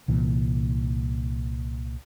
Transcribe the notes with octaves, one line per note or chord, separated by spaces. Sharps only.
C2 A#2 E3